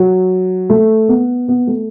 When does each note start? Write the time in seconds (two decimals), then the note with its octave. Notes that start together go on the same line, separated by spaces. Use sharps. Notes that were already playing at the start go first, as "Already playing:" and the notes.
Already playing: F#3
0.70 A3
1.09 B3
1.48 B3
1.67 A3